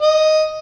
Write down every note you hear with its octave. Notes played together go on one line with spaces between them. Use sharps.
D#5